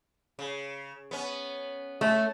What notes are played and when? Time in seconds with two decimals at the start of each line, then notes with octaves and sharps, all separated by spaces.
0.39 C#3
1.11 B3 C#4
2.01 A3 C#4